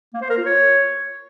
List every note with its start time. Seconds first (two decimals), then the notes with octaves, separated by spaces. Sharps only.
0.14 A#3
0.22 C5
0.30 A#4
0.38 F4
0.45 C#5